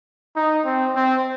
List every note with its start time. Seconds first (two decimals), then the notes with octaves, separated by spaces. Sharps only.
0.36 D#4
0.65 C4
0.95 C4